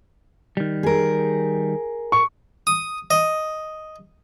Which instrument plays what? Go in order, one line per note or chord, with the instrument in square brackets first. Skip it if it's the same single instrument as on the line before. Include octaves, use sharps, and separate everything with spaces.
[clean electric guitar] D#3 G3
[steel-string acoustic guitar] G#4 A#4
[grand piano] C#6
[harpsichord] D#6
D#5